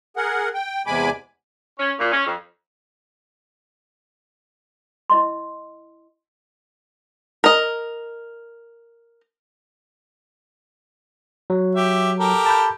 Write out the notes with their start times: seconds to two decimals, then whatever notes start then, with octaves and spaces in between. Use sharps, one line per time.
0.17 G#4 A#4 F#5
0.54 G5
0.86 E2 C3 G#3 G#5 B5 D6
1.79 C#4
1.99 A#2
2.12 C#4
2.26 F2
5.10 E4 D#5 C6
7.44 A#4 D#5
11.50 F#3
11.75 G4 E5
12.19 G4 A4 A#4
12.46 A5 B5 G6